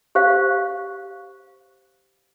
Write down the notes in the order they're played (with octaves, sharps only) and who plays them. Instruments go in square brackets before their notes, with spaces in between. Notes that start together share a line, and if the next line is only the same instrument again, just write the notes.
[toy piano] G4 C5 F5